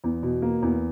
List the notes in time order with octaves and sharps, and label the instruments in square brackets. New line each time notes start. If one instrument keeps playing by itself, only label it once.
[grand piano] E2
B2
A#3
E2